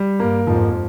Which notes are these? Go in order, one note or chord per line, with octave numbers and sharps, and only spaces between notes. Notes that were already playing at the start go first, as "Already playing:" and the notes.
Already playing: G3
G2 A#3
F2 G#2 F3